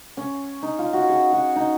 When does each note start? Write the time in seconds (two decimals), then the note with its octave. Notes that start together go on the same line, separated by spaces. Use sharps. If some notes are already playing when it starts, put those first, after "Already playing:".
0.17 C#4
0.62 D#4
0.79 F4
0.93 F#4
1.09 G#4
1.32 F#4
1.56 D#4